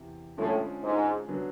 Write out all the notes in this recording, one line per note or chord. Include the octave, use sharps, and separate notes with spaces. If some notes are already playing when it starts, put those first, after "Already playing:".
Already playing: E2 C3 E3
A2 D3 F3 G#3 C#4
G#2
D3 F#3 B3